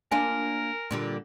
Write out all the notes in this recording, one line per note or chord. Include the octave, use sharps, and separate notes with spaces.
A#3 D4 F4 A#4 G#5
A#2 D3 G3